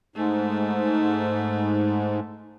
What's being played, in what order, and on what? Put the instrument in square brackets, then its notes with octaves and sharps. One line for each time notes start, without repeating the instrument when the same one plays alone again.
[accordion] G#2 [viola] A3